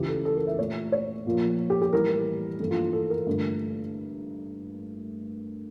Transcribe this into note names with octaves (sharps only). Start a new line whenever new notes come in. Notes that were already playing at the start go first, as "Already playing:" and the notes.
Already playing: C#2 C#3 E3 G4
A4
A4
A#4
E5
A#2 A3 C#5
C#5
A#2 F3 A#3
G4
G4
A2 E3 G3 A#4
G2 E3 A#3 A4
F4
A4
A#4
G2 D3 A3